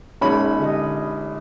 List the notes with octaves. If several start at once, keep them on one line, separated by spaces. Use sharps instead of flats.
A#1 G#3 C#4 D#4 F4 B5
D3 G4 D#5